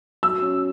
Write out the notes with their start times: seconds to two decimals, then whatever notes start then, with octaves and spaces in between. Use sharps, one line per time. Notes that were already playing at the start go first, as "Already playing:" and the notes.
0.23 F#3 E6
0.42 C#4